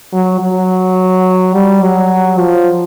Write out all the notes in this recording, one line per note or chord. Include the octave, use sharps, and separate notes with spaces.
F#3
F#3
G3
F#3
F3